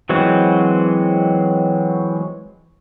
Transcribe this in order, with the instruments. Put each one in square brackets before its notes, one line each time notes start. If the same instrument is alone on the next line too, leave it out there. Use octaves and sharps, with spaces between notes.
[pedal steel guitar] E3 F#3 G#3 C4 F#4